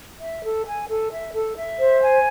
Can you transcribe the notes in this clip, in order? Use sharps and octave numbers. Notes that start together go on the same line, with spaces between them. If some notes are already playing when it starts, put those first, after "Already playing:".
E5
A4
G#5
A4
E5
A4
E5
C5
G#5